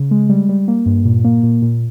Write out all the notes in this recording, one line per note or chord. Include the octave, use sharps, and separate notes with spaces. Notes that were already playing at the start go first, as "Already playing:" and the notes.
Already playing: C#3
G#3
G3
G3
A#3
G2
A#2
A#3
A#2
A#2